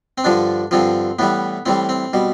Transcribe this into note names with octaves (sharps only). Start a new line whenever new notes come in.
C4
G2 D3 F3 D4
G2 D3 F3 C4
A2 E3 G3 B3
A2 E3 G3 C4
C4
B2 G3